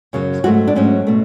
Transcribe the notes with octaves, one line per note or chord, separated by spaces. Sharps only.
F#2 C#3 F#3
G#2 F#3 A3 F#4
D4
G#2 F#3 A3 C#4
B2 A3